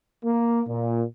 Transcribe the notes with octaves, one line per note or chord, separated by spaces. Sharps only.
A#3
A#2